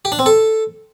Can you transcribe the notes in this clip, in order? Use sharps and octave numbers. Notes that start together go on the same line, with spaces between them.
G4
D4
C4
A4